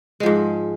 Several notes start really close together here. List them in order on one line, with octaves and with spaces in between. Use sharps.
G#3 F3 G#2